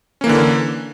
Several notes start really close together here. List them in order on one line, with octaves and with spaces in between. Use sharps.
C#4 A#3 E3 D3